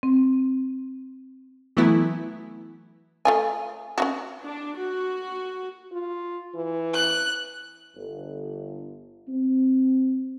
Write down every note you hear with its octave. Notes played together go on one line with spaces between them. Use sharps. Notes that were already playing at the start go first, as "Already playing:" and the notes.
C4
E3 F#3 A3 B3 E4
A3 F4 G#5
C#4 D#4 F#4
D4
F#4
F4
E3
F#6
G1
C4